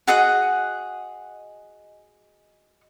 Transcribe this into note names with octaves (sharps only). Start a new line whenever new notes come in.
F#4 G#4 D#5 F#5